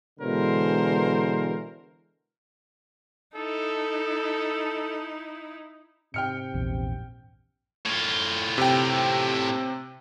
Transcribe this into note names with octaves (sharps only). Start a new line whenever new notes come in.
B2 D3 E3 G#3 A#4 C5
D#4 E4 A4
G#2 C3 G5 F6 C#7
A#1 E2
A2 F4
C3 G5